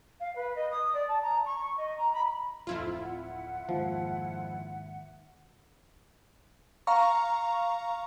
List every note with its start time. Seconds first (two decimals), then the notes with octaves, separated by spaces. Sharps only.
0.20 F5
0.35 B4
0.55 D#5
0.70 D#6
0.93 D5
1.08 A5
1.22 A#5
1.45 C#6
1.77 D#5
1.97 A#5
2.13 B5
2.67 D1 F2 E4 F4
3.01 E5 F#5
3.69 D#2 G#2 F3
6.87 F5 A#5 C#6